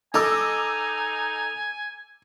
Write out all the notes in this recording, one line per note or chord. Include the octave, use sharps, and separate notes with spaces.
D#4 A4 D#5 G#5 D6 E6